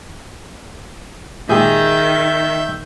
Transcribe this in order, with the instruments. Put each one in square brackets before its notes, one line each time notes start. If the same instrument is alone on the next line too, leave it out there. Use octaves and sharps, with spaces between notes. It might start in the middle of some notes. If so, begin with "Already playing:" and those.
[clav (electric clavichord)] A#2 G#3 G4 [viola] D#3 [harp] G#4 [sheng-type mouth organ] E5 G6